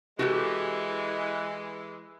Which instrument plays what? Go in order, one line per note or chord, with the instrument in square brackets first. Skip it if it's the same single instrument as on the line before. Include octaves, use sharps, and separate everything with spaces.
[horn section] E3 G#3 [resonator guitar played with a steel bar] F#4 G4 A4